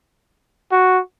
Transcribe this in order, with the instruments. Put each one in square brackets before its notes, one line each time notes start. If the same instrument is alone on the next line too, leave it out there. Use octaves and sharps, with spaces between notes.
[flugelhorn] F#4